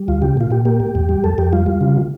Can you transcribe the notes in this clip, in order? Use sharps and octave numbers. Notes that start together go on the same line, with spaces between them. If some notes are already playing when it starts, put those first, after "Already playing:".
Already playing: G3
D2 F4
C#3 G4
A#2 F4
A#2 G4
A#3 G4
A2
E2
G3
F2 A4
F2 G4
G3 F4
G3
C#3